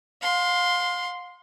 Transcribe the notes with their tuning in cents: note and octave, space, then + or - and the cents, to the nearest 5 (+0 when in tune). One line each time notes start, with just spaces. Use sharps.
F5 +35 C6 +0